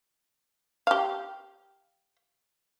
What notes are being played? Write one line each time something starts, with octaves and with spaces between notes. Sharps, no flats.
G4 F5